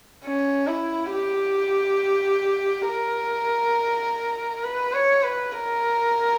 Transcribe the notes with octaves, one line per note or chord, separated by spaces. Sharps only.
C#4
E4
G4
A#4
B4
C#5
B4
A#4